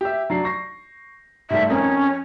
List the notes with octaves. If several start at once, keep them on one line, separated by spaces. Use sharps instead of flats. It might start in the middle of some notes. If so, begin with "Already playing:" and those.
G4 E5
F#3 D4 C7
C#6 A#6 C7
G#2 G3 A3 E5
F2 C#4 A#4 D#6